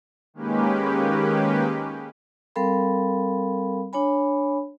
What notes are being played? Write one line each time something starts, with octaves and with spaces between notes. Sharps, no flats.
D#3 G#3 A#3 C#4 G4 B4
G3 C4 A4 A#4 F5 B5
D4 C#5 G#5 B5